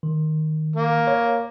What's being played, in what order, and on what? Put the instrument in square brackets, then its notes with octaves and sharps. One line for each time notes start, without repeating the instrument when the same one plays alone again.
[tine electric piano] D#3
[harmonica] A#3
[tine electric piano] C#5